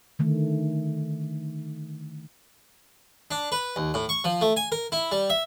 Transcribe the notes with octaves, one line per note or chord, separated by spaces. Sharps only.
D3 D#3 A3
D4
B4
D#2
A2
C#6
F3
A3
G#5
A#4
E4
G3
E5